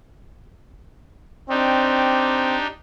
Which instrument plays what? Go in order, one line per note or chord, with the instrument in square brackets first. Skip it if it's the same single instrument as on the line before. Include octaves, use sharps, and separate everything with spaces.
[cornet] C4 [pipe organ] D4 D#4 G4